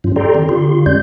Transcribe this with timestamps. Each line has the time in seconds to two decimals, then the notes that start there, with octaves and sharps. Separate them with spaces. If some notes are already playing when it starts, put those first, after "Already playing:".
0.04 G2 F#3 C#4 F4
0.16 G4 A4 D5 G5 A#5 C6
0.34 D#3 C4
0.49 D3 F4 G4 C6
0.86 F2 G#3 C#4 D5 G6